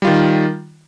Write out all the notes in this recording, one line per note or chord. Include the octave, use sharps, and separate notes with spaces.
D#3 G3 F4